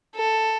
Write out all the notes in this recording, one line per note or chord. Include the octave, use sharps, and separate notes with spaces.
A4